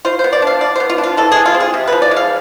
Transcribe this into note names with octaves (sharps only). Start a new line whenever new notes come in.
F4 C5
C5
B3
D5
D4 F5
B2 D5
B3 C5
F4
D4
F4
E3 A4
G#4
G#3
F4
C4
G#4
C3
B4
F3
D5
G#3
F5